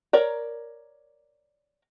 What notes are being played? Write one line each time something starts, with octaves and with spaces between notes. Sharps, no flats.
A#4 C#5 D5 A#5